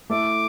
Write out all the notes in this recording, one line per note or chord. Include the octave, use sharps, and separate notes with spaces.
A3 E4 A4 E5 D6